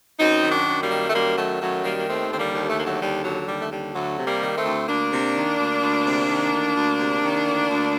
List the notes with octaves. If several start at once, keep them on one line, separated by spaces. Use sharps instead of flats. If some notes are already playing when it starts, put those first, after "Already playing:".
F#2 C4 D#4
D#3
D4 F#4
F#2
G3 A#3
D#3
A3
F#2 G3 A#3
D#3 F#3 A3
F#2 F#3 A3
D#3 G3 A#3
A#3
D#2 A3 C4
D3 C4
G3 A#3
D#2
A3
D3 A#3
F#3 A3
D#2 G3
D3 F#3
D#2 G3
A3
D3 G3
D2 F#3 A3
C3
G3 A#3
D#3
A3 C4
D2
D2 A#3 D4
C3
D#3
D2
D2
C3
D#3
D2
D2
C3
D#3
D2
D2